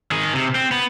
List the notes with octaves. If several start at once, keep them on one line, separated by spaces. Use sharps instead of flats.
D#3 G#4
C3
C4
B3